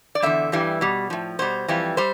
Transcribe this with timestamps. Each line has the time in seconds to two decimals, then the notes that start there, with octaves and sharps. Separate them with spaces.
0.15 D5
0.22 E2 D3 G3 E5
0.52 G2 E3 G3
0.81 B2 G3
1.10 A2 F3
1.39 B2 G3 C5
1.68 F2 E3 G3
1.97 G3 C5